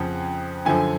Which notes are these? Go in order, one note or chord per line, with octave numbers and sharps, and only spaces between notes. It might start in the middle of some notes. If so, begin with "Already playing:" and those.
Already playing: F2 C#3 F3 F#5
F#2 D3 F3 G#5